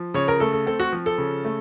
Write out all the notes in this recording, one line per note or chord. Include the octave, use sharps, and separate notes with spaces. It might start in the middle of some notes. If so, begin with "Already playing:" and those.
Already playing: F3
C#3 C#5
A#4
A3 A4
A4
C4 A4
F#4
F3
A4
C#3
A3